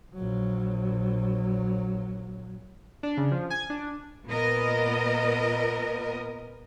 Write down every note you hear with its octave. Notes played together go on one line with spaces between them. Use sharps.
A#1 F#3
D4
C#3
F3
G#5
D4
A#2 B3 A#4 D#5